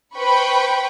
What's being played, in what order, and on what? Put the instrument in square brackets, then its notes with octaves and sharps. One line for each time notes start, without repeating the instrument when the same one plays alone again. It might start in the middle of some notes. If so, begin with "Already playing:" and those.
[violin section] B4 C5 G5 B5 C#6